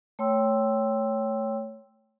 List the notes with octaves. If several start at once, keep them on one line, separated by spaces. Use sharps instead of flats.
A3 C#5 G5 C6 E6